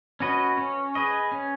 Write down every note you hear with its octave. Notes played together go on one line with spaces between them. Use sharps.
C#4 F#4 B4 D#5
C#4
G#4 B4 D#5
C#4